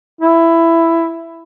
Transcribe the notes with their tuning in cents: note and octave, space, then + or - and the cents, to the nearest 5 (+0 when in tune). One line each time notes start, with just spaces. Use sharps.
E4 +10